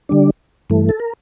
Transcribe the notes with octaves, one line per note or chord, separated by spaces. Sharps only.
D3 G3 D4
G2 E3 A3
A4
A#4